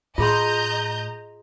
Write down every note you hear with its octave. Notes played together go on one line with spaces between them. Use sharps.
A2 F4 G#4 D#5 A#5 C6 G6